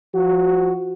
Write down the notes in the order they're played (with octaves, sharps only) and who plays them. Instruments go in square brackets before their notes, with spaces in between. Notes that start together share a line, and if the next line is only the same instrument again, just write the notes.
[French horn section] F3 F#4